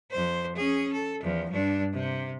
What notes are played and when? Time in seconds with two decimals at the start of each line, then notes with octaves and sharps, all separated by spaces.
0.11 F2 C5
0.56 C#4 G#4
0.93 A4
1.23 E2 F3
1.52 G2 D4
1.93 C3